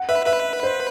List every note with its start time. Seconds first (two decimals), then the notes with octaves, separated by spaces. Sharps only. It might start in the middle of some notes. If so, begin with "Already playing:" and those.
Already playing: F#5
0.09 B4 E5
0.26 B4 E5
0.63 C5